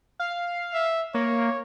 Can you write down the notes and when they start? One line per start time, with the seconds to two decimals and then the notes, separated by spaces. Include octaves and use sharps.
0.20 F5
0.74 E5
1.14 A#3 C#5